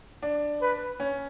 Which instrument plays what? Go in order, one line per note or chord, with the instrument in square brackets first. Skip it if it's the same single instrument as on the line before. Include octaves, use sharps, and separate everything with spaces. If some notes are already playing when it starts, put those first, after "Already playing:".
[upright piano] D4
[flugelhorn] B4
[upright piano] C#4